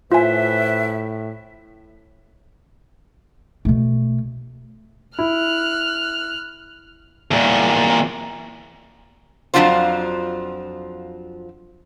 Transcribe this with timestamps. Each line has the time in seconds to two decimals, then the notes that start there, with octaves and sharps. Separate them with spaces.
0.12 A2 F4 B4 C5 E5 G#5
3.65 B2 A3
5.19 E4 F6 F#6
7.31 E2 A#2
9.54 F2 F3 F#3 D4 F4 C5